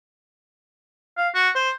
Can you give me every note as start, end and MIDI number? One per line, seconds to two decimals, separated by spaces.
1.17 1.29 77
1.35 1.49 66
1.55 1.70 72